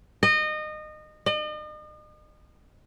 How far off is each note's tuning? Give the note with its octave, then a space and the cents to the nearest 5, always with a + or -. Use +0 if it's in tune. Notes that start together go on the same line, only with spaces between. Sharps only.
D#5 -25
D#5 -40